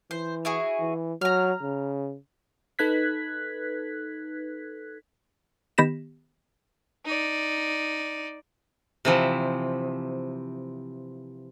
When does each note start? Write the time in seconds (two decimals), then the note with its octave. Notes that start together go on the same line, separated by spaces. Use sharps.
0.11 E3 C5
0.45 E4 F#4 G#4
0.79 E3
1.21 F#3 A#5 F6
1.62 C#3
2.79 D#4 A4 B4 F#6 G#6 B6
5.78 D#3 B3 G4 A#6 B6 E7
7.06 D#4 D5
9.05 C3 E3 F3